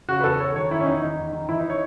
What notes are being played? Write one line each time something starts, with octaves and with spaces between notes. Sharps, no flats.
C#3 F#4
B4
E2 A4
E2 C#5
D#3 C#5
D#3 E4
C#4
E2 D#4
D#3 D#4
E2
D#3
E3 E4
D#4
C#5